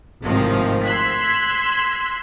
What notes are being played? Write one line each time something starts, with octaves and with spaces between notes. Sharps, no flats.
G#1 A2 C3 D#3 F3
C6 E6 F#6 G#6 B6